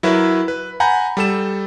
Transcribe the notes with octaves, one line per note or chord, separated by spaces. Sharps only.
F#3 E4 A#4 B4 E5
B4
F#5 G#5 A#5 B5 G6
G3 A4 E7